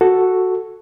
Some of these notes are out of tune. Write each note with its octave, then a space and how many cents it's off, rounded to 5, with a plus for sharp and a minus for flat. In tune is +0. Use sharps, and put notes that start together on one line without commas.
F#4 +0 A4 +0